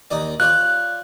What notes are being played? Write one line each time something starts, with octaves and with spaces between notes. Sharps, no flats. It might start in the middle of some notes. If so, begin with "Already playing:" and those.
D#2 D#4 D5
F4 C#5 D5 F#6